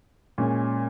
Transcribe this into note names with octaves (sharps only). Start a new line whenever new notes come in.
A#2 G#3 C#4